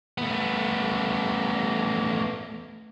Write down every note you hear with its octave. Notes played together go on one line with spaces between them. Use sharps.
A3 B3